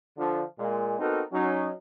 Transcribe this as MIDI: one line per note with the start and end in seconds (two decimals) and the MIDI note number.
0.18 0.43 50
0.18 0.43 53
0.59 0.98 46
0.59 0.98 56
1.00 1.22 59
1.00 1.22 60
1.00 1.22 63
1.00 1.22 66
1.00 1.22 69
1.00 1.22 70
1.32 1.70 54
1.32 1.70 61
1.32 1.70 63